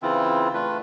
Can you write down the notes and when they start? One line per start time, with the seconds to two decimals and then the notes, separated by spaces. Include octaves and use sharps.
0.02 C#3 E3 C4 E4 F4
0.54 A3 D4 F4 B4